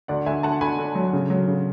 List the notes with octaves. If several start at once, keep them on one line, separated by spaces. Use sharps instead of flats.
D2 D5 F#5
D2 E5 G#5
D2 F#5 A5
D2 G#5 B5
D3
F#3
C#3
F#3
C#3